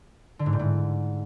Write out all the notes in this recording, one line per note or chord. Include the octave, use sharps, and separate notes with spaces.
D3
G#2
A2
G#2